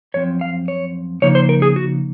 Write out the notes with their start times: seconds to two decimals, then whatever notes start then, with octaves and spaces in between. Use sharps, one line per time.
0.14 F#2 F3 C4 C#5
0.41 F5
0.68 C#5
1.22 C#3 F3 A#3 D#4 C#5
1.35 C5
1.49 A#4
1.62 G#4
1.76 F#4